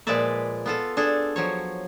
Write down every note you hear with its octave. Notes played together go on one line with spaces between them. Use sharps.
A#2 F3 G#3 B4 D5 E5
B3 F4 A4
D4 G#4 A4
F3 F#3 C#5